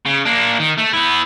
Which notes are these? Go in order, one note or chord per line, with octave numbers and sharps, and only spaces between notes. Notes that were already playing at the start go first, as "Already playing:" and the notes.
C#3
A#3 D4
D#3
A3
B3 E4